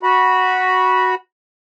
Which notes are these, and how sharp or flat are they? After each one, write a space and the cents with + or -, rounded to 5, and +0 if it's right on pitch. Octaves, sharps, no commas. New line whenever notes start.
F#4 +0 B5 -20